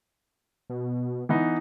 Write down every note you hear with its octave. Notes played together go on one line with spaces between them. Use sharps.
B2
E3 B3 D#4